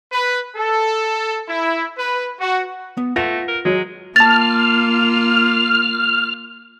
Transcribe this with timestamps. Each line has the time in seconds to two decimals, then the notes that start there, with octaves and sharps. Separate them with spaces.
0.12 B4
0.55 A4
1.47 E4
1.96 B4
2.39 F#4
2.97 B3
3.16 A3 F4 B4 F#5 A#6
3.48 A#4
3.65 F#3 G#3
4.16 A#3 F4 A5 F6 A6